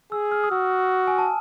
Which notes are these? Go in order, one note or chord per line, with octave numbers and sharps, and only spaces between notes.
G#4 E6
F6
D#6
F#4 E6
G#5
A5